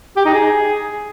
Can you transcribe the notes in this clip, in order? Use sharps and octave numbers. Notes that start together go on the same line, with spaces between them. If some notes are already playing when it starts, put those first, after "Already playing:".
G4
D#4
G#4